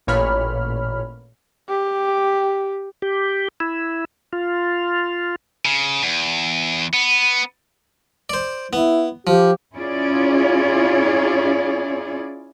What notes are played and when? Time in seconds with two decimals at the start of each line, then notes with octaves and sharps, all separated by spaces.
0.07 A1 A#2 C#5 B5 F6
1.69 G4
3.02 G4
3.60 E4
4.33 F4
5.65 C#3
6.03 E2
6.94 B3
8.30 C5 D5
8.73 B3 E4
9.27 F3 G4
9.75 C#4 E4 F4 G#4 C#5 D5